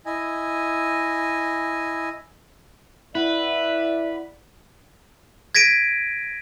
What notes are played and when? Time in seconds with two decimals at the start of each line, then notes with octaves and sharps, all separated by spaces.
0.06 E4 D#5 G#5
3.15 E4 B4 D5 E5 F#5
5.55 G#6 A#6 B6 D7 D#7